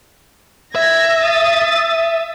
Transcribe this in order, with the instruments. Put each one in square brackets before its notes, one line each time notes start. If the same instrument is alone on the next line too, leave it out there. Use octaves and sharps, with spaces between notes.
[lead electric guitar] E5 [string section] G#6 A#6
[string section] D#6 A6